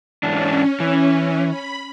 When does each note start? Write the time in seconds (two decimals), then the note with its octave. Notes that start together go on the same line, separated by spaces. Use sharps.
0.23 G#2 E3 C#4 D4
0.80 E3
1.48 B5